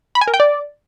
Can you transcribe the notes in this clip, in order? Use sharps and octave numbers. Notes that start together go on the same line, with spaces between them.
B5
G#5
A#4
G5
D5